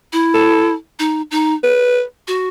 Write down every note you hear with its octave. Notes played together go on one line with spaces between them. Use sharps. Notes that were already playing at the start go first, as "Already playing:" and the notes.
E4
A4
D#4
D#4
B4
F#4